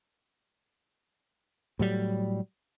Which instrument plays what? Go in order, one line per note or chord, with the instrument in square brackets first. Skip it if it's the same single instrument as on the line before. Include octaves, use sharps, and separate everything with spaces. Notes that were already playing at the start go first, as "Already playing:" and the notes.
[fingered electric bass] A2 F#3 G3